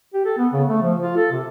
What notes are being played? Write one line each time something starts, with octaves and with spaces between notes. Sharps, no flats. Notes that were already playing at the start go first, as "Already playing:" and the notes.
G4
A4
B3
C#3
A3
F3
F4
A4
C3